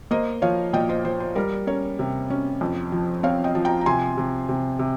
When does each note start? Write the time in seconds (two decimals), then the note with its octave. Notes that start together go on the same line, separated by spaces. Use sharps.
0.11 A#3 C5 D#5
0.42 F3 C#5 F5
0.73 A#2 D#5 G5
0.89 C5 D#5
1.05 F3 C5
1.20 C5
1.35 G3 A#4
1.67 C#4 A#4 C#5
1.99 C3
2.30 C#4
2.61 F2
2.92 F3
3.23 C4 C#5 F5
3.44 D#5 G5
3.55 F3
3.65 G5 A#5
3.81 A#5
3.86 C3 G#5 C6
4.17 C3
4.49 C3
4.79 C3